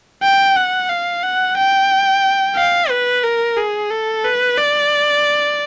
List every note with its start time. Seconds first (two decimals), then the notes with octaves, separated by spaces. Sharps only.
0.23 G5
0.56 F#5
0.89 F5
1.23 F#5
1.57 G5
2.57 F5
2.90 B4
3.24 A#4
3.57 G#4
3.91 A4
4.24 B4
4.58 D5